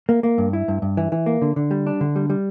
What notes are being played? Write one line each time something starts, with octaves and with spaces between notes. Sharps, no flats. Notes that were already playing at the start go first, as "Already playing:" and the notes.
A#3
A#3
G2
E4
G2
G2
E3
E3
A#3
D3
D3
G3
D4
D3
G3
G3